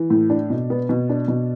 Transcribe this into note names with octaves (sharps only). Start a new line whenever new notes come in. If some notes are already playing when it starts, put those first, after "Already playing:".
Already playing: E3
A2
D4
B2
B3
B2
D4
B2